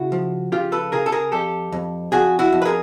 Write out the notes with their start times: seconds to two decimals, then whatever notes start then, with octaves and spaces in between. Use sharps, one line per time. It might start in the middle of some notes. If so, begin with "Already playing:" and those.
Already playing: C#3 E4 F#4
0.12 F3
0.52 C#3 F4 G4
0.72 A4 B4
0.92 C#3 G#4 A#4
1.06 A4
1.12 G#4 A#4
1.32 F2 G4 A4
1.72 F2
2.12 F2 F#4 G#4
2.39 E4 F#4
2.52 F2
2.62 B4
2.65 G#4 A#4